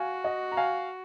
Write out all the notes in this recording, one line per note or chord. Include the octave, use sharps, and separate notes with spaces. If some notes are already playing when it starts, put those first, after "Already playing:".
Already playing: F#4 F5 G#5
D#5 F#5
A#5
F5 G#5